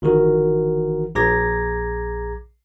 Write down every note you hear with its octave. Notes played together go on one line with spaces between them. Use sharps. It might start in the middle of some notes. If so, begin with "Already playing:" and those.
G1 D#3 E3 F#4 A#4
A#1 G#4 A#5 D6 G#6 A#6